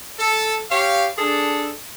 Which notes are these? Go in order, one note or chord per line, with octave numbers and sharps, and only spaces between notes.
A4
G4 C#5 F5
D4 G#4 A4